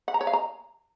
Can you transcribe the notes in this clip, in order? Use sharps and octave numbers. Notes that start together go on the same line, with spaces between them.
F#5
A#5
C#5
F5
A#5